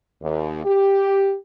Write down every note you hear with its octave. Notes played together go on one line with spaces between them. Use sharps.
D#2
G4